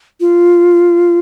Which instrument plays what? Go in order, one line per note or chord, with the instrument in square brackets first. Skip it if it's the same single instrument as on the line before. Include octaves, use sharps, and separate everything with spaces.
[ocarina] F4